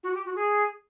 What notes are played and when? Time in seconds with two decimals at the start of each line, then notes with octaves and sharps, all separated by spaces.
0.03 F#4
0.14 G4
0.25 F#4
0.35 G#4